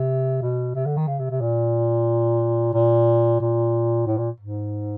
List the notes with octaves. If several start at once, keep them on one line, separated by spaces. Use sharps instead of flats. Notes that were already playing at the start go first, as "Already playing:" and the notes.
Already playing: C3
B2
C3
D3
D#3
C#3
C3
C3
A#2
A#2
A#2
A2
A#2
G#2